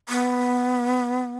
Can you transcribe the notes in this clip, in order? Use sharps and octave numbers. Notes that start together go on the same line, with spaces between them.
B3